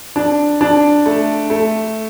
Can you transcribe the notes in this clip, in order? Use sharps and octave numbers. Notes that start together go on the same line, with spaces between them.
D4
D4
A3
A3